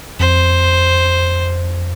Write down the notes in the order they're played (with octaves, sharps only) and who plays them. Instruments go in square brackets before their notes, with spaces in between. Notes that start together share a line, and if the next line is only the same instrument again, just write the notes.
[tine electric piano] F2 [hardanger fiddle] C5